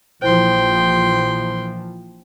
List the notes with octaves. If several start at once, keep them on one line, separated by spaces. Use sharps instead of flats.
A#1 E3 F3 E4 C5 G5 C6